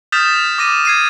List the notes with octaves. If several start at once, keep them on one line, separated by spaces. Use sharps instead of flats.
D#6 F6 G6 A6 B6 E7
D6 A#6 D#7 E7
G#6 C7 D#7